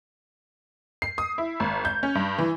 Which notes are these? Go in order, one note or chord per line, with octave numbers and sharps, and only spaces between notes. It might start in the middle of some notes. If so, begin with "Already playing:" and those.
C7
D#6
E4
G#1
G6
C#4
G2
E3